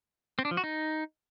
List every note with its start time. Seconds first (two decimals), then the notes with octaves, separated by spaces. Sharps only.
0.39 C4
0.45 D4
0.51 F3
0.57 F#4
0.64 D#4